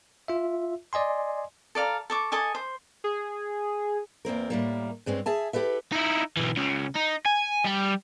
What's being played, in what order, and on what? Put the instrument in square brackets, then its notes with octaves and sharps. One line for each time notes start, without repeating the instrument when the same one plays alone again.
[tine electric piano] F4 E5
D5 D#5 G#5 C6
[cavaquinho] A4 D5 F5 A#5
A4 C#6 D6
A4 D#5 G#5 D6
C5
[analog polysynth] G#4
[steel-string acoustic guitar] E2 A#3 C4 A#4
A2 G3 A#3
G2 G#3 C4 C#4
G#4 E5 G#5 A5
E4 G4 A4 B4 E5
[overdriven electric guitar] D#4 E4
B1 E3
C#2 C#3
D#4
G#5
G3